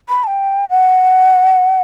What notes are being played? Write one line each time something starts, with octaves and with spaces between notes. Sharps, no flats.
B5
A5
G5
F#5